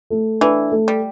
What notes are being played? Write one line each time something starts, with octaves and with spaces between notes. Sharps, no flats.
A3
E3 D4
A3
G3